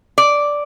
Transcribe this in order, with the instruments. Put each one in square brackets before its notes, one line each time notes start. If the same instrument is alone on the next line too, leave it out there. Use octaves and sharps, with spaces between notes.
[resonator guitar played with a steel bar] D5